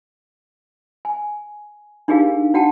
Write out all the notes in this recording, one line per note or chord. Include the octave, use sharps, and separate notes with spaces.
G#5
D4 D#4 G4 G#4 A#4 F5
D4 F#4 F#5 G5 A5